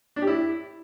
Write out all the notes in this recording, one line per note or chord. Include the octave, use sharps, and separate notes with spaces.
D4
G4
E4